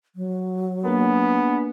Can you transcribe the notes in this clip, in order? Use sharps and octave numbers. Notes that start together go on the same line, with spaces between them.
F#3
A#3 B3 D4 G#4 A#4